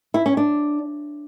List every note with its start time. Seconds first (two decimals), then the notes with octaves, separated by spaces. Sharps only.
0.14 E4
0.26 C#4
0.37 D4